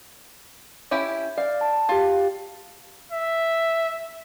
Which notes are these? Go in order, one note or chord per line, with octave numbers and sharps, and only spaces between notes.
C#4 E4 G4
D5 F5
A5
F4 G4 F5
E5